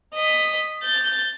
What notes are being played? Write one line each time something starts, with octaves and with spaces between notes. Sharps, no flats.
D#5 B6
G6 A6